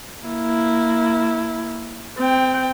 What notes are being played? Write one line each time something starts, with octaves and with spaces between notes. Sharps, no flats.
A#3 E4
C4 G5